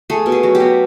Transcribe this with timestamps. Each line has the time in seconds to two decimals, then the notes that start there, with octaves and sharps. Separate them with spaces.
0.10 A3 G#4
0.26 B2
0.32 G#4
0.43 F#3
0.55 G4
0.60 B2